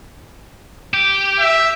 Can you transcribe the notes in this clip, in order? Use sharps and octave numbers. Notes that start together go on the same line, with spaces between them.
G4
E5